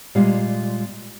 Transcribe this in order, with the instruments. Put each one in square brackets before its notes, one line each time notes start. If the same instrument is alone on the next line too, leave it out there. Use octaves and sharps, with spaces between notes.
[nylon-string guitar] A#2 G3 G#3 F4 F5